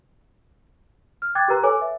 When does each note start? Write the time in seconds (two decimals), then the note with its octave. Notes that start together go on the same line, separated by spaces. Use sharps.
1.22 F6
1.35 G5 D6 F#6 G#6 A6
1.48 G4 A#4 B4 A#5 F#6
1.63 A4 B4 C#5 G#5 D6
1.81 E5